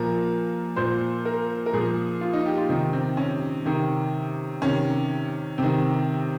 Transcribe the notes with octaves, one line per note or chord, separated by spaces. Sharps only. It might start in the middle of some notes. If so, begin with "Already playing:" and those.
Already playing: A#2 F3 A#4
A#2 F3 C5
A#4
A#4
A#2 F3 G#4
F4
D#4
G4
F4
C3 D#3 D#4
C4
C#4
C3 D#3
C3 D#3 C#4
C3 D#3 C4